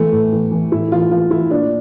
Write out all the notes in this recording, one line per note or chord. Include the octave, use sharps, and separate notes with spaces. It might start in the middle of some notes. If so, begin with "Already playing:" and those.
Already playing: E3 A3
A2
E3
E3
A2 E4
E3 F4
E3 F4
E3 E4
A#2 D4